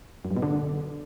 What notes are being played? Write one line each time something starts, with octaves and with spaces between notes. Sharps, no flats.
F#2
G2
B2
D3